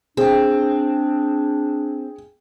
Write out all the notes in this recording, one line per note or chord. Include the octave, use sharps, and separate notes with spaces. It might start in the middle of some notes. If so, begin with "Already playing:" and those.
C4 D4 G#4